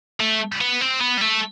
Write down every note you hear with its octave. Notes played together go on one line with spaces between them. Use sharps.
A3
B3
C4
B3
G3
A3